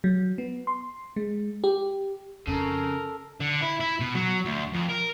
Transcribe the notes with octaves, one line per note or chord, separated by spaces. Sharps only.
F#3
B3
C6
G#3
G4
F2 C#3 A4 A#4
D3
E4
E4
B2
F#3
D2
F2
A#4